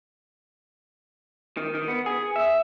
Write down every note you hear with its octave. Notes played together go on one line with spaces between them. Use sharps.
D#3
D#3
B3
G#4
E5